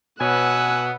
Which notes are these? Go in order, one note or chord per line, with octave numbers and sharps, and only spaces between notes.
B2 B3 C#5 G#5 E6 F#6